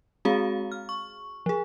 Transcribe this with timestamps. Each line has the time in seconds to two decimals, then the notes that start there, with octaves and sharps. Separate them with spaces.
0.25 G#3 C4 F#4 G#4 F5 A#5
0.72 F6
0.89 C#6
1.46 F3 G#4